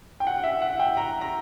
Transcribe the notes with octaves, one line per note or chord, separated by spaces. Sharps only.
G5
F#5
E5
F#5
G5
A#5
A#5